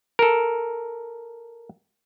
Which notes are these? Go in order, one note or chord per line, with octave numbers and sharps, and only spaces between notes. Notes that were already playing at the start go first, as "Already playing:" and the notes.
A4 A#4